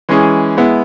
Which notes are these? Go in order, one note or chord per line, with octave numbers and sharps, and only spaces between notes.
E3 G#3 C#4 G#4
G#3 B3 E4